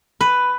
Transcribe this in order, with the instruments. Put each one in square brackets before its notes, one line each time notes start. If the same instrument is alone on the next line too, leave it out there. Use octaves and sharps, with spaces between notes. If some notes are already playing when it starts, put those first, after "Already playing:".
[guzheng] B4